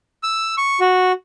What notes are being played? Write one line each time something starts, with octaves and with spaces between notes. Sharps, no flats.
E6
C#6
F#4